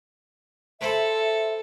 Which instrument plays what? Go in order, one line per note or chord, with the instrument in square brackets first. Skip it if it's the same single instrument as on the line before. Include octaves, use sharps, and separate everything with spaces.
[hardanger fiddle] A4 [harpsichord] B4 C5 B5 [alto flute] E5